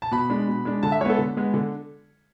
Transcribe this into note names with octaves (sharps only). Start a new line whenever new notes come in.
A5
B2 B5
G#3 D4
B2
G#3 D4
D3 A5
E5
G#3 B3 A4 C#5
D3
G#3 B3
D3